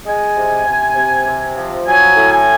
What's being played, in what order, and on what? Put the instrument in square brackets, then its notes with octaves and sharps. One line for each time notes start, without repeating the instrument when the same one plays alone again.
[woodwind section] G#3 G#5
C3
C3
C3
C3
F3
F#3 G#5
A2
G#5